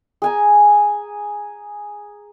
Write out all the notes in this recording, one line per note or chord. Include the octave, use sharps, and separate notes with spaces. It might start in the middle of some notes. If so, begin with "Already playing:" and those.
G#4 G#5 A#5